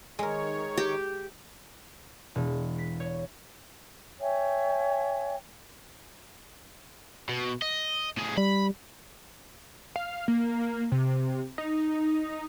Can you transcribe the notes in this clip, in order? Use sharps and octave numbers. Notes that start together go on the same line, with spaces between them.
D#3 G#3 A#4 C#5
G4
E1
B6
C#5
C#5 E5 G5 G#5
B2
D#5
A2 G#4
G3 B5
F5
A#3
C3
D#4